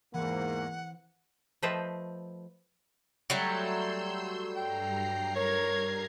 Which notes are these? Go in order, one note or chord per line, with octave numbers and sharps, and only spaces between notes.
E2 G#2 E3 A#3 C4 F#5
F3 A3 B4 C5 D#5 G5
F#3 G3 A3 C6 E6 G6
G2 G5 A#5 C7
A#4 C#5 G#6